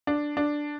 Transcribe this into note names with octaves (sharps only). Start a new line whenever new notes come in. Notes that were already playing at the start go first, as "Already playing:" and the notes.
D4
D4